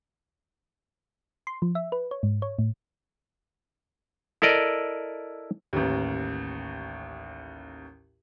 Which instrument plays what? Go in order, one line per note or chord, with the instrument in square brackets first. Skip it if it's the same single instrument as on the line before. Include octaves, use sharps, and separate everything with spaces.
[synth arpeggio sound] C6
F3
E5
B4
C#5
G#2
C#5
A2
[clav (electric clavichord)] E4 A4 A#4 D5 D#5
[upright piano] A1 D#2